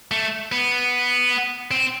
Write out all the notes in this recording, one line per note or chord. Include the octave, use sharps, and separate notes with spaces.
A3
B3
C4